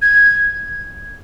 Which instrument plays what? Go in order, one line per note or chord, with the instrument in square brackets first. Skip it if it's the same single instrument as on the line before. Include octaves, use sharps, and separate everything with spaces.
[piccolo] G#6